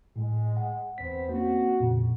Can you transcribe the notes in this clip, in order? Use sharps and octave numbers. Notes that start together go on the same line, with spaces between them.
A2 G#3
F#5
E2 B3 C4 C5 B6
A#3 C4 C#4 F#4
F2 A#2 C#3